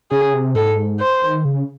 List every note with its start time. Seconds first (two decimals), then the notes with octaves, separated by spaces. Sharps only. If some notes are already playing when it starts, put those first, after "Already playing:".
0.11 C#3 G#4
0.33 C3
0.55 G#2 A4
1.00 C5
1.22 D#3
1.45 C#3